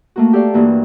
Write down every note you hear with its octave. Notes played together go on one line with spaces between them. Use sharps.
A3 A#3 F#4
G4 A4 D5 F5
G2 E3 A#3 F#4